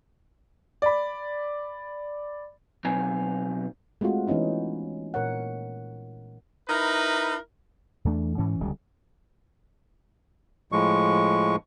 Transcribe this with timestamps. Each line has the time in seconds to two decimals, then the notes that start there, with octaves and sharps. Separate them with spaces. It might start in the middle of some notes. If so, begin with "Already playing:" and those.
0.82 D5 B5
2.85 B2 F#3 C4 D#4 G#5 A#5
4.01 G#3 A3 C4 F4 F#4
4.27 E3 B3 C#4 D#4 E4
5.14 A#2 A#4 C#5 F#5
6.69 D#4 E4 A#4 B4
8.05 E2 E3 A3 D4
8.38 G#2 E3 C#4
8.60 D1 C#2 D3 G3
10.72 A2 F3 G#3 C#6